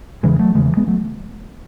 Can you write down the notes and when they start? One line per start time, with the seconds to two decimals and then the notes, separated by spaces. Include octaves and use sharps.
0.23 E2 C#3 E3 G#3
0.39 F#3 A3
0.55 E2 C#3 E3 G#3
0.66 E3 G#3
0.77 G#3 B3
0.87 F#3 A3